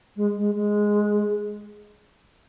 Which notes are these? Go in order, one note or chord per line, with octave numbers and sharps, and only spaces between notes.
G#3
G#3
G#3